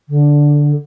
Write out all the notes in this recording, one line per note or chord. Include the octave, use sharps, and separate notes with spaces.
D3